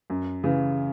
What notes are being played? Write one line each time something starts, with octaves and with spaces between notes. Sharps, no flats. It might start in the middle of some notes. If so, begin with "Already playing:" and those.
F#2
C#3 E3